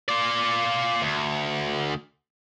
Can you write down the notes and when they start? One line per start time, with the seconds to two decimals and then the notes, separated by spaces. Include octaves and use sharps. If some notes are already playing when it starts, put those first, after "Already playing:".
0.09 F4 D5
1.02 D2